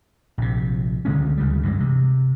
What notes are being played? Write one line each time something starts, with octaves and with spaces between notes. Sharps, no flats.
A#1 C3
C#2 D3 G#3 C#4
D2 C#3 G3
G2 E3 G#3
C3